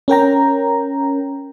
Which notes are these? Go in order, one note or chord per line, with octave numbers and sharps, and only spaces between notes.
C#4 A#4 G5 A#5